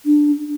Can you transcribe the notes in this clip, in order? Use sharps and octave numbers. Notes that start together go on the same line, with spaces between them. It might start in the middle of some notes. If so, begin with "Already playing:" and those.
D4